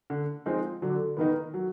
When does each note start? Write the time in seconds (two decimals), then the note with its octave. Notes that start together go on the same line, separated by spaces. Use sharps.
0.10 D3
0.46 F3 G#3 C4 D#4
0.82 D3 F#3
1.17 D#3 B3 D#4
1.54 F#3